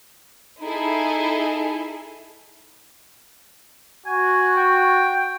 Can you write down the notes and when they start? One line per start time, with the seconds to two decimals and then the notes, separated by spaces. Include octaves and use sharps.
0.62 D#4 E4 G#4 A4
4.06 F#4 G#5
4.57 G5